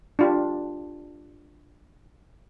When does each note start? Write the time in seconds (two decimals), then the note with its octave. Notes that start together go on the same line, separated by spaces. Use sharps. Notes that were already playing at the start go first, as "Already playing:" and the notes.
0.19 D4 F4 G4